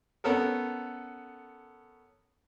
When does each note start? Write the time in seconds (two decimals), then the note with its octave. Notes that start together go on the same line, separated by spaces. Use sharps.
0.24 B3 C#4 A4 A#4